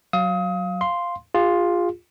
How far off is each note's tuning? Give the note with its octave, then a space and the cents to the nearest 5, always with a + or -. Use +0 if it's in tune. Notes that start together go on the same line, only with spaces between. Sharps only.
F#3 +0 F5 +0 D#6 +30
F5 +0 C6 +0
F4 +5 G#4 -40